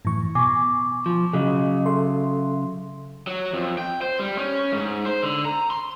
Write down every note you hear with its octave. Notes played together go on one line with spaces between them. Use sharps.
F#2 A2 E3 C#6
B2 G#5 C#6 D6
F3
C#3 F#3 G#4 D#5
A4 E5 C6
F#3
F2
G5
C5
G3
C#4
G#2
C5
D3
A#5
C6